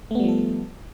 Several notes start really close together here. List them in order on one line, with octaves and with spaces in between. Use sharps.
A3 B3 G3 F3 A4